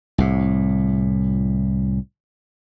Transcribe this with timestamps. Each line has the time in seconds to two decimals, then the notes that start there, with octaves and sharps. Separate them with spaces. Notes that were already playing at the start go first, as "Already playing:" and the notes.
0.18 C2 A2